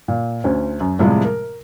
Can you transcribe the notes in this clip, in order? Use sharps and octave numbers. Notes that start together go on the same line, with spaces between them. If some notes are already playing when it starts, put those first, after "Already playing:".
A#2
D2 C#4
F#2
A2 C3 F3 G3 G#3
A#4